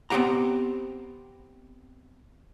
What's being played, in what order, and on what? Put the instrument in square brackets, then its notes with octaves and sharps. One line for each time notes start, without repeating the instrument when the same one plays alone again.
[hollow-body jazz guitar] B3 C4 D4 G4 F#5 A#5